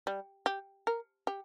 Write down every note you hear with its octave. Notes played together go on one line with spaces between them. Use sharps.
G3
G4
A#4
G4